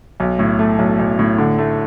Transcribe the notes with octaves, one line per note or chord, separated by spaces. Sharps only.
B1
A2
A3
B1
B1
A2
D3
A3